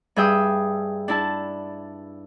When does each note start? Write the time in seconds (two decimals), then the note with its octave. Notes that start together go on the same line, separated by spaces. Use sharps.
0.16 G2 G#4 E5 G5 D#6
1.08 D4 E4 A5